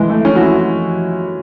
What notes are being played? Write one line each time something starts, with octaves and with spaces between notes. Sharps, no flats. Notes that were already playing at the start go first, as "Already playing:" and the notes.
Already playing: E3 G#3
A3
C#4
F#4
E4